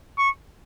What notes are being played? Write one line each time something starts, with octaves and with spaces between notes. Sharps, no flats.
C#6